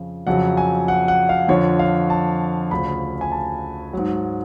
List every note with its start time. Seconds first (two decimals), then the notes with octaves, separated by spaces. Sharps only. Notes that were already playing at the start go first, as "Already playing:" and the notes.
Already playing: F2 C#3 F3
0.27 F2 C#3 F#3 F#5
0.57 G#5
0.88 F#5
1.08 F#5
1.29 F5
1.48 F2 D3 F3 C#5
1.79 F5
2.10 A5
2.71 D2 C#3 F3 B5
3.21 G#5
3.32 A5
3.93 G#2 F#3